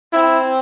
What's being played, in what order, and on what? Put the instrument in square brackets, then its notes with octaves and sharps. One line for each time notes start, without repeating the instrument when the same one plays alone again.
[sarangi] C4 [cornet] E4